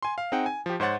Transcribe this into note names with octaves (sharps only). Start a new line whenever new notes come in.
G#5 C6
F5
C4 D#4 G#4 F#5 G5
G#5
F3 G4
G#2 C5 C#5 F#5 A6